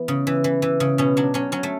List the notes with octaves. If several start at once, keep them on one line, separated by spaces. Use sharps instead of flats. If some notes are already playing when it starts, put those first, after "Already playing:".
Already playing: E3 B3
C#3
E3
E3
E3
C#3
B2 C#4
F#3 D4
F#3 C#4
F#3 C#4
A3